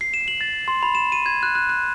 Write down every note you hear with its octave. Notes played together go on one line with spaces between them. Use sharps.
C7
E7
F#7
A6
C6
B5
E7
D#7
G#6
F#6
F#6
F#6